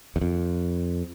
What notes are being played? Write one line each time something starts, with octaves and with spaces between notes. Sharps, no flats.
E2
F2